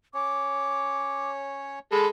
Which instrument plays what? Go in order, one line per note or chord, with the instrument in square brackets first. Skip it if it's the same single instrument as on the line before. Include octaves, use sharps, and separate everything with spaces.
[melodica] C#4 C#5 [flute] D6
[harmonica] G#3 A4 [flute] B5